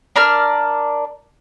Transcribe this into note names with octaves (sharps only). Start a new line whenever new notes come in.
D4 A#4 D5 F6